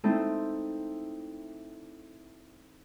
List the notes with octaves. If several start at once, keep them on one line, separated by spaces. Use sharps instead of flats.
A3 C4 D#4 E4